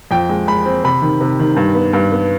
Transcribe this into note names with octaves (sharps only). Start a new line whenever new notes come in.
F2 G5
G#3
G#3 B5
C4
C3 B5
D#3
C3
D#3
G2
B3
G2
B3